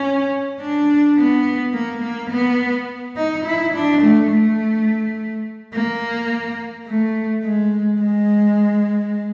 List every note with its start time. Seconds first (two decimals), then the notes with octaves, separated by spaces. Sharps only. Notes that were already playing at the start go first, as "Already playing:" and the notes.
Already playing: C#4
0.60 D4
1.17 B3
1.73 A#3
2.02 A#3
2.31 B3
3.16 D#4
3.45 E4
3.74 D4
4.02 A3
4.30 A3
5.73 A#3
6.87 A3
7.44 G#3
8.01 G#3